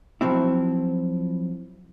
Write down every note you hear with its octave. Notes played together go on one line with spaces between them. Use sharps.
F3 F#3 C4 E4